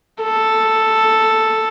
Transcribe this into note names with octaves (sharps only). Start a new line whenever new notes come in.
A4